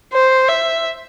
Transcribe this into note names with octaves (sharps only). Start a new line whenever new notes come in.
C5
E5